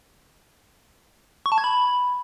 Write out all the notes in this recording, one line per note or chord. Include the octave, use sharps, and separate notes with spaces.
C#6
A5
G#6
B5